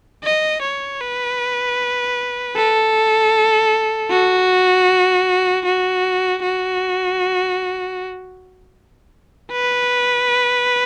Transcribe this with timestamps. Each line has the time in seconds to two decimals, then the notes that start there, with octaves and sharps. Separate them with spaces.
0.24 D#5
0.62 C#5
1.00 B4
2.56 A4
4.11 F#4
5.65 F#4
6.43 F#4
9.52 B4